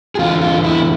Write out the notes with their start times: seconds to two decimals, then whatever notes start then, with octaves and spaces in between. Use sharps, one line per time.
0.15 G#4
0.19 E2 D3 F4
0.42 F4
0.64 E4